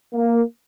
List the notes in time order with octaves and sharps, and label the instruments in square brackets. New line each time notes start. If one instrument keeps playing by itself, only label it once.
[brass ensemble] A#3